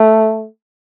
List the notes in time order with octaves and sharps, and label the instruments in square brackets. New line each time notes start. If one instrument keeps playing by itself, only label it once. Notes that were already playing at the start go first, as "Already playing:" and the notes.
Already playing: [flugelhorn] A3